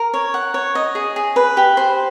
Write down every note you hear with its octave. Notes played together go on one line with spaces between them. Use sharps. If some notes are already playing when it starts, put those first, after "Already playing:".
Already playing: A#4
C#5
F#5
C#5
D#5
G#4
G#4
B4
G4
C5